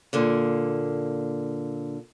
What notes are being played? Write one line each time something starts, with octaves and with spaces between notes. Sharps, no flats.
A#2 D3 A#3